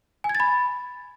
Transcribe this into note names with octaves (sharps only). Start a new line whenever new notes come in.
G#5
G#6
A6
B5